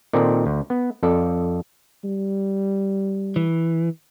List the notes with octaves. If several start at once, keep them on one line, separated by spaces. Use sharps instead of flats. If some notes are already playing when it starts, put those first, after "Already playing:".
A#2 D#3 C4 A4 D5
D2
B3
F2 A4 D5
G3
E3